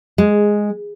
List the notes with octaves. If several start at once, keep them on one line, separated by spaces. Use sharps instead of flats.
G#3